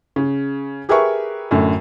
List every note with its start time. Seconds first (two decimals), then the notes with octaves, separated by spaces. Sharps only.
0.16 C#3
0.89 G4 G#4 A#4 B4 E5 C#6
1.51 F#2 A2 D3